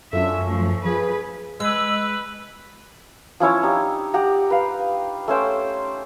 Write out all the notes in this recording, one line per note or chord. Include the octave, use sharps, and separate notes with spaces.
F#2 C#4 D4 F4 A4 E5
F3 A3
F3 G#4 B4
G#3 B4 D#5 E6
F3 C#4 E4 C#5
D4 D#4 G4
G4 F#5 A#5
B4 F5
A3 C#4 C5 G5